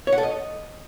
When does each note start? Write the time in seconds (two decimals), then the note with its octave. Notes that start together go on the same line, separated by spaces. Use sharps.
0.07 C#5
0.12 F#5
0.18 A4
0.23 D#5